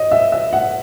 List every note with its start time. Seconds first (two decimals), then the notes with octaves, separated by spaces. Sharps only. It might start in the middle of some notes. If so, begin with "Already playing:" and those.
Already playing: D#5
0.12 E5
0.32 E5
0.53 F#5